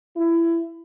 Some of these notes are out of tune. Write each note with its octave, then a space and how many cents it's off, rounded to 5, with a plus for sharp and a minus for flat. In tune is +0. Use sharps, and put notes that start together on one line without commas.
E4 +25